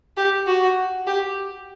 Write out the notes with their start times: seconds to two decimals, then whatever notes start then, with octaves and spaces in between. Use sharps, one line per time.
0.17 G4
0.47 F#4
1.06 G4